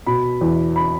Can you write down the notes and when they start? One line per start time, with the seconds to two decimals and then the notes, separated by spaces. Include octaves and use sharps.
0.06 B2 B5
0.41 E2
0.76 B5